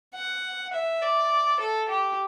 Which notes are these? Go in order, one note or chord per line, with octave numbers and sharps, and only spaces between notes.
F#5
E5
D5
A4
G4